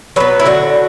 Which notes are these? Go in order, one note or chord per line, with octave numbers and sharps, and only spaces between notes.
F#3 B3 B4
E4
D3 F#4